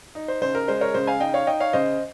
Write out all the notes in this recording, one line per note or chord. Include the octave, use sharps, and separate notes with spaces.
D#4
C5
C#3 C5
A#4
G#3 C5
A#4 C#5
C#3 C5
F5 G#5
D#4 D#5 G5
C#5 F5
D#4 D#5 G5
C#5 F5
C#3 C5 D#5